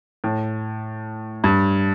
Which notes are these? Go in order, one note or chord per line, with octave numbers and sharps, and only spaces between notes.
A2
G2